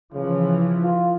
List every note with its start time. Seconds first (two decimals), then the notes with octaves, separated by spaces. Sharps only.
0.14 C#3 E3 F3
0.83 F4